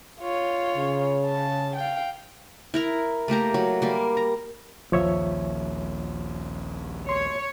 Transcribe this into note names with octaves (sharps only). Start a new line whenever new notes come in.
F4 C#5
C#3
A5
F5 G5
E4 A#4 A#5
A3 A#3 G4 A#5
F#3
G3 A#3
A#5
A#1 D#2 F3 C#5 E5
C#5 C6